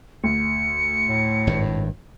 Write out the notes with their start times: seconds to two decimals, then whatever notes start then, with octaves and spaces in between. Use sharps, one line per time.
0.24 D2 C#7
1.08 A2
1.47 G#1 G2